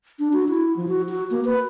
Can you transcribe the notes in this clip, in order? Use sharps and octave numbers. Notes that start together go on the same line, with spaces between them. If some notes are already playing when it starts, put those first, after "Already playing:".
D4
F#4
E4
F3
F#4
F#4
A#3
B4